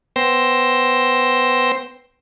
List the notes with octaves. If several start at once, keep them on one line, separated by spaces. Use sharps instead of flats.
B3 C5 G5 C6 E6 A#6